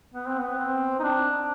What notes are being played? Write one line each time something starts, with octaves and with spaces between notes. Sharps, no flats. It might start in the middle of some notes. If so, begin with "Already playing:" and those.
B3
C4
B3
C4
D#4
D4